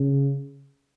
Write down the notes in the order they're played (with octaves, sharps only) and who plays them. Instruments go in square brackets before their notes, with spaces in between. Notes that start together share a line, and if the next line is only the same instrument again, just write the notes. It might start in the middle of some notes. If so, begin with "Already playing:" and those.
Already playing: [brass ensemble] C#3